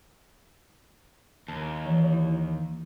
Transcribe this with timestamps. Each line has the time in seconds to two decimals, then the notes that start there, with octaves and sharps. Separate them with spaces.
1.48 D#2 A5
1.86 E3 F3
2.13 E4